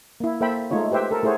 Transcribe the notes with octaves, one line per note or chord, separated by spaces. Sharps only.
A#3 E4
A#3 A4 C5 E5 G5 B5
G#3 A3 D#4 F4 C#5
G4 B4 C5 E5 G5
A4 A#4
A3 E4 G#4 C5 C#5 F#5